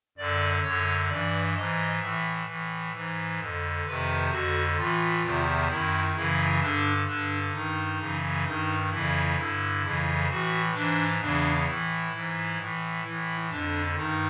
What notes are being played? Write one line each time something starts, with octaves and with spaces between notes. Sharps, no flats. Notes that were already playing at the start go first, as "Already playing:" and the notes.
F#2 D3 D5
F#2 D3 C#5
G2 E3 D5
G#2 E3 D#5
A2 E3 E5
A2 E3
G#2 E3
F2 D3
F2 C3 D#3 B4
F2 D3 F#4
A2 E3 F4
E2 C3 D#3
F#2 D#3 E4
F#2 C#3 E3 E4
G2 D3 D4
G2 D3 D4
G2 D#3 D#4
F#2 C#3 E3
G2 D#3 D#4
F2 C#3 E3 E4
G2 D3 E4
F2 C#3 E3
A2 E3 F#4
G#2 E3 D4
E2 C#3 E3 D4
A2 E3 E4
G#2 E3
A2 E3
A2 E3 E4
F2 D3 D4
G2 D#3 D#4